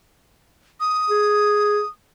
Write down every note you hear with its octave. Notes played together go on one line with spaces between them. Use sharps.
D#6
G#4